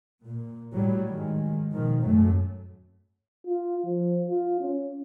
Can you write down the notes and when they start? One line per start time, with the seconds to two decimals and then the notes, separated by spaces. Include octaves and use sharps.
0.24 A#2
0.72 A2 F#3 G3
1.09 G#2 D#3 G#3
1.73 B2 D#3 F3
2.04 G#1 F#2 F#3 A3
3.47 F4
3.86 F3
4.27 F4
4.61 C#4